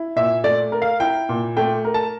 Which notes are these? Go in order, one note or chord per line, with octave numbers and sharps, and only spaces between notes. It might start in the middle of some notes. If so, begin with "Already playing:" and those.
Already playing: E4
A#2 E5
A3 D5
A#4
F5
E4 G5
A#2
A3 G5
A#4
A5